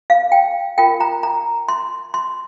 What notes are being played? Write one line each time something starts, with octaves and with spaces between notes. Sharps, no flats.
F5
G5
F4 A#4 G5
A#5
A#5
C6
C6